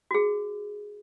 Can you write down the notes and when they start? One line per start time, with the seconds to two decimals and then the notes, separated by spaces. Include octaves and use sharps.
0.11 F#4 G#4